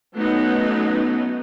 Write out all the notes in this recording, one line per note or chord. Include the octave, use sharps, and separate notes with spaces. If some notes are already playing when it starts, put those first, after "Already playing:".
F#3 A3 B3 C#4 D#4